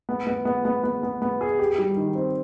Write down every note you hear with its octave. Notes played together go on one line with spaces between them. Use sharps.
B3
B3
B3
B3
B3
B3
B3
G#4
G4
G3
D#3
C4